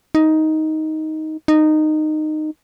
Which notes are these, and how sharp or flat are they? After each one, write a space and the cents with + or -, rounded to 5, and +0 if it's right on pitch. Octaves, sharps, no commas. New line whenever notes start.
D#4 +10
D#4 -15